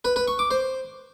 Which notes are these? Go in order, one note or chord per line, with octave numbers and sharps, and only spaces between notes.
B4
B4
C#6
D6
C5